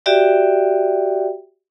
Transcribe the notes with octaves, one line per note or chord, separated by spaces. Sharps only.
F#4 G4 D5 E5 G5